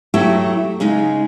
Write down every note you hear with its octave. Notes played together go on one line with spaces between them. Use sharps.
F#3 A3 E4 F#4 G4 A4
C#3 G#3 D#4